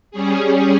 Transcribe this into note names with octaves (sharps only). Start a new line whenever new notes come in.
G3 C#4 G#4